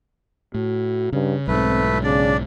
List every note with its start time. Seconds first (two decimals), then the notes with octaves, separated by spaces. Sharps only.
0.54 A2 F#4
1.13 G2 C#3
1.48 B1 G#2 A3 C4 B4
2.03 C#3 D4 D5